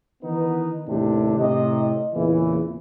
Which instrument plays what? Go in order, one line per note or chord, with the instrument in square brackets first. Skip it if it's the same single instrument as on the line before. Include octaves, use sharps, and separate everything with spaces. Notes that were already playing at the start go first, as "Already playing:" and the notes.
[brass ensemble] D#3 E3 B3 D#4 B4
D#2 A2 C3 D4 G4
A2 C3 D#5
E2 A#2 C#3 E3